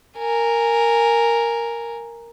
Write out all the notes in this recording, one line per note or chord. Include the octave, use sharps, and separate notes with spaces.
A#4 G#5